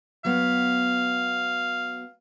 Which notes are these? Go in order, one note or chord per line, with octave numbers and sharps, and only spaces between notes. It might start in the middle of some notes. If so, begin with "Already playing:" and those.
F#3 B3 F5